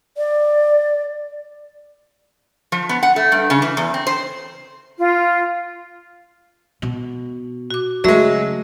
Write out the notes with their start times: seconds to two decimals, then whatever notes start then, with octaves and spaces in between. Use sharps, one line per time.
0.17 D5
2.72 F3
2.89 B3
3.03 F#5
3.16 A3
3.32 G2
3.50 C#3
3.62 E3
3.77 E2
3.94 C4
4.07 C5
4.98 F4
6.82 B2
7.71 F#4 D6
8.04 C#3 F#3 G#3 A3 E5 C#6